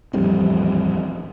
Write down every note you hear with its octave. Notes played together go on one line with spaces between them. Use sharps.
D#1 A1 F2 G3